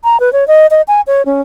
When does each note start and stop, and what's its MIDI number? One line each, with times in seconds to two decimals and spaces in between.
0.04 0.20 82
0.20 0.32 71
0.33 0.47 73
0.48 0.67 75
0.71 0.82 75
0.88 1.01 80
1.07 1.22 73
1.26 1.41 61